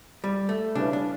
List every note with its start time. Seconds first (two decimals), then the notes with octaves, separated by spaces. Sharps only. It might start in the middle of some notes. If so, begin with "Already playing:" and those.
0.24 G3
0.49 A3
0.75 C#3 G3 C#4 D4 E4 B4
0.93 D4